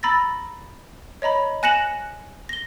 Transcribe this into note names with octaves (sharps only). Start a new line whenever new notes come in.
A#5 B5 E6 A6 A#6
C#5 D#5 A#5 B5
G#5 F#6 A#6 C#7 E7 F#7
A#6 G7